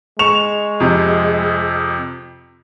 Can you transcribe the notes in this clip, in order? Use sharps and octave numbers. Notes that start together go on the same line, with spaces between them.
G#3 C#6 E7 F7
F2 C3